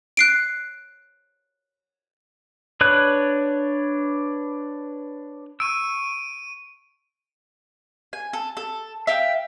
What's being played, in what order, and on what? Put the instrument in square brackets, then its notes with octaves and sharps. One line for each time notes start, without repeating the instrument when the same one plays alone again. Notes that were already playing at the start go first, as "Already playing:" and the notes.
[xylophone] F#6 C7 D7
[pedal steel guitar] D4 B4 C#5 F#6
[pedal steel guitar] C#6 E6 [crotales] D7 D#7
[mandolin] G#5
A4
A4
E5 F5 G5